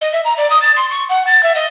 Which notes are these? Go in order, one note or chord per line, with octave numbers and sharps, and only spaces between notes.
D#5
E5
A#5
D5
D#6
A6
C6
C#6
F#5
A6
E5
D#5